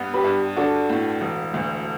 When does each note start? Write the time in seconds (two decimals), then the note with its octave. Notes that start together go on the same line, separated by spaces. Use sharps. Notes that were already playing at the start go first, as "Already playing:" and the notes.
Already playing: G2 B3
0.14 G4 B4
0.24 G2
0.56 D4 F#4 A4
0.90 A2
1.21 E1
1.54 D2